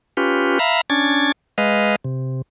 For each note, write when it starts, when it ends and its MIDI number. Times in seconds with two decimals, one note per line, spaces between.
0.17 0.59 61
0.17 0.59 65
0.17 0.59 67
0.17 0.59 71
0.59 0.81 76
0.59 0.81 77
0.59 0.81 82
0.59 0.81 83
0.90 1.32 61
0.90 1.32 62
0.90 1.32 92
0.90 1.32 93
1.58 1.96 56
1.58 1.96 71
1.58 1.96 75
1.58 1.96 77
2.05 2.42 48